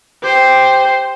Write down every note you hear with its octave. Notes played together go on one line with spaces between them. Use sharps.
G4 C5